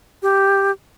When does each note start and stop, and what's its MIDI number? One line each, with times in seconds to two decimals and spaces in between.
0.22 0.71 67